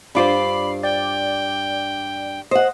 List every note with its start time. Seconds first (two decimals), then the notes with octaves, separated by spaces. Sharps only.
0.15 G2 D4 F4 C5 B5 D6 C7
0.83 D5 G5
2.51 C5 D#5 F#5